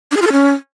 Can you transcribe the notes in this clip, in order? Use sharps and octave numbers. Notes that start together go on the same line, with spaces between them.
D4
G#4
F4
A4
C#4